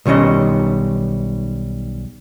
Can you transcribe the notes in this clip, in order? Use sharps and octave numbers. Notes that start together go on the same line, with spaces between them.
B1 D#3 G3 C#4 D#5